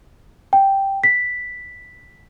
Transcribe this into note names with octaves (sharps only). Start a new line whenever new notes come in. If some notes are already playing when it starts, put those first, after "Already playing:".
G5
B6